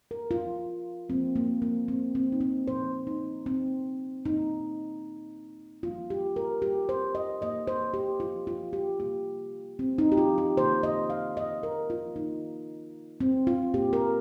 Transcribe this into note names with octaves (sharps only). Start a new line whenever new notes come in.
A#4
F4
C3 F3 A#3 C4
A#3
A#3
C4
C4
D#4
C4
A#2 F3 A#3 C5
D#4
C4
A#2 A#3 D#4
D#3 G3 A#3 F4
G4
A#4
G4
C5
D#5
A#2 A#3 D#5
C5
G4
F4
F4
G4
C3 G3 A#3 G4
C4
D#4
G4
F4
G4
C3 D#3 A#3 C5
D#5
F5
D#5
A#4
F4
D#3 A#3 D#4
C4
F4
A#2 A#3 G4
A#4